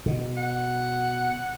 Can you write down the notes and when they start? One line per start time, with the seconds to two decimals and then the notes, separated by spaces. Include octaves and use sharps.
0.06 B2
0.37 F#5